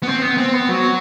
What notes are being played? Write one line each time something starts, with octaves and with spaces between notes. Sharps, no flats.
B3
C4
B3
C4
B3
F#3